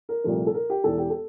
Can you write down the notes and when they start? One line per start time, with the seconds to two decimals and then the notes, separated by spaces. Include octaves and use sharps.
0.09 A#4
0.24 C2 A#2 F3 A3
0.47 A4
0.54 A#4
0.70 G4
0.84 E1 E2 E3 A4
0.98 G4
1.10 A4